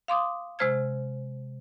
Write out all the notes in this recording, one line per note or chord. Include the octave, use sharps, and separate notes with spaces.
F5 C6 D6 D#6
C3 G#3 C5 F6 G#6